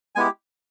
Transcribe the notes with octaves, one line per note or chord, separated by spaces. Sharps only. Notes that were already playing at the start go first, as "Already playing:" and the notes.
G#3 B3 E4 G4 G#5